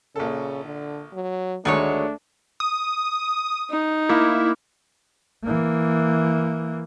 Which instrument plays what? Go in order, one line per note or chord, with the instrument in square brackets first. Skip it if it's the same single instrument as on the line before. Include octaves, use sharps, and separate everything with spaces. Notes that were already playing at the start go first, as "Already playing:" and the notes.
[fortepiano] A#1 A4 [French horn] C#3
[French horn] D3
F#3
[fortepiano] D2 G#3 [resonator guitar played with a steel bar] D#3 F#4 C#5 [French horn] A3 [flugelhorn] D4
[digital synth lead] D#6
[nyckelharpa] D#4
[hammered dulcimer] A#3 [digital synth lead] E4
[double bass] E3 A#3